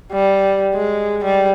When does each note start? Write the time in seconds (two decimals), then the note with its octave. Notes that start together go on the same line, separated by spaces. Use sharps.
0.12 G3
0.74 G#3
1.24 G3